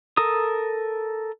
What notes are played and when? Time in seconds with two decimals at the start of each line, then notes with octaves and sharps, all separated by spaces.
0.17 A4 A#4 D#6